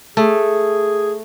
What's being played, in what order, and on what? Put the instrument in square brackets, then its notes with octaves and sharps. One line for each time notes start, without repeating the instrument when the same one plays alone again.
[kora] A3 [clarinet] G#4